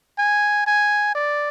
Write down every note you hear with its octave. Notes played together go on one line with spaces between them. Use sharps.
G#5
G#5
D5